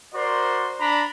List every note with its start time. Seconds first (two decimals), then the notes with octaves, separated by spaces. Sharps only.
0.15 F#4 A#4 C5 D5 C6
0.80 D4 A#5 B5